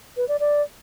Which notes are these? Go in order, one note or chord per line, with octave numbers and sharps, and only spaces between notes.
B4
D5
D5